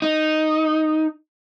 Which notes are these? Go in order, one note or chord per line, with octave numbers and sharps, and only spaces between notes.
D#4